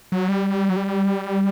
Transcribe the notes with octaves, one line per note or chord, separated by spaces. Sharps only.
F#3
G3
F#3
G3